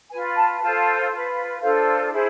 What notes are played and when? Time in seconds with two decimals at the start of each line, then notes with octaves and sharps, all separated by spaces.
0.10 F4 B4 G#5
0.36 A5
0.61 F4 A4 C5 A5
1.11 F4 B4
1.61 D4 F4 A4 C5 F5
2.11 E4 G#4 C5